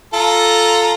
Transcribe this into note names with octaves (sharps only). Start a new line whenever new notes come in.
F4 A4 A#5